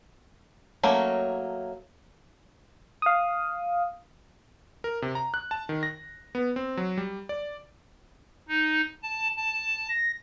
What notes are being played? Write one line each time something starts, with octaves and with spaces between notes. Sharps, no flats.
F#3 A3 A#3 C#4
F5 D#6
A#4
C3
A#5
F#6
A5
D#3
A#6
B3
C4
F#3
G3
D5
D#4
A5
A5
A#6